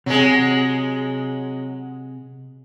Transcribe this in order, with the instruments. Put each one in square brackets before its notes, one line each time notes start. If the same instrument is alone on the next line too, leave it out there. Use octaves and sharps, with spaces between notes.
[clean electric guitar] C3 [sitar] F#3 G#3